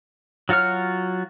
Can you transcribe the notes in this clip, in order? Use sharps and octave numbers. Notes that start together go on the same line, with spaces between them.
F#3 F4 F#4 C#5 F6